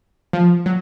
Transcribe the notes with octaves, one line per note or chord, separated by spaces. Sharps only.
F3
F#3